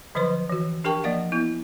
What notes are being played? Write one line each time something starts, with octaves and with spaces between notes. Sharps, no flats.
D3 F3 F#3 B4 C5 C6
E3 F#4
D4 G4 A#4 G5 A5 C#6
F3 A#3 D5 F5 F#5
B3 E4